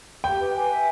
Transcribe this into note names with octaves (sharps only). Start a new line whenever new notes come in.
G4 G5
B4
G#5
E5